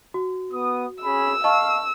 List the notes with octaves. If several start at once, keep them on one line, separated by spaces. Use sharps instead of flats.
F#4
B3 D#6
C#4 G#4 B5 E6
D#5 F5 A5 C#6